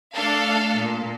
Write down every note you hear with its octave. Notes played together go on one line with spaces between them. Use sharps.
A3 D4 A4 F5
A#2